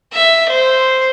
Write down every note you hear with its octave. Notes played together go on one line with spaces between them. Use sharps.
E5
C5